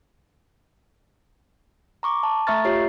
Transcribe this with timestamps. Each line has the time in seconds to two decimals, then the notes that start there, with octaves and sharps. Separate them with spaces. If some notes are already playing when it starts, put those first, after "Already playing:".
2.03 A#5 C#6 D6
2.23 A5
2.47 A3 E5 A#5 C#6 F6 A6
2.65 F4 G4 C#5 C7